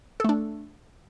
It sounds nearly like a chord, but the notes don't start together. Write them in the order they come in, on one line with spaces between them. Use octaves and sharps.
A4 A3 D4